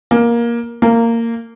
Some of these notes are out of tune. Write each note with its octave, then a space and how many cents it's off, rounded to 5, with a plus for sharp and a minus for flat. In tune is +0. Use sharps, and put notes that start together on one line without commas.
A#3 +15
A#3 -15